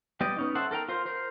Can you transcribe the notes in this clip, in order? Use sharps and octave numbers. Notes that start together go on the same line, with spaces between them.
G3 B3 G4 D5 D#5
B3 C#4 D#4
A4 C5 E5 F#5
A4 A#4 G5 A#5
F4 A#4 C5
A#4 C5